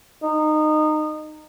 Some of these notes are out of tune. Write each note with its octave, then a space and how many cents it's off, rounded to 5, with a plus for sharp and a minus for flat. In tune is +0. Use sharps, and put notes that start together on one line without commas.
D#4 -20